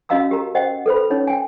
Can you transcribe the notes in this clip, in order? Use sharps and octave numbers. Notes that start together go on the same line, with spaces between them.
C#4 F#4 D#5 F5 A#5 E6
G4 A#4 A#5
C5 D#5 F#5 G5
A4 B4 C5 B5
C#4 D#4 C#5
G5 G#5